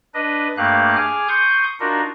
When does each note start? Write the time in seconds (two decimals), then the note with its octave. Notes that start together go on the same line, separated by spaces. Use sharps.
0.14 D4 B4 D#5
0.57 G2 A3 A#3 G4 F5 F#6
0.96 G#4 G#5 D6 F6
1.28 C6 C#6 D#6 G6
1.80 D4 D#4 F4 F#4 A#4